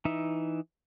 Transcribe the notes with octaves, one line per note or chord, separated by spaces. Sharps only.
E3 D#4 E5